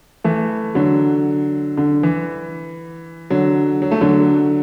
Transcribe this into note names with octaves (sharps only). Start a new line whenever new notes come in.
E3 A3
D3 F#3
D3
E3
D3 F#3
F#3
A3
D3 F#3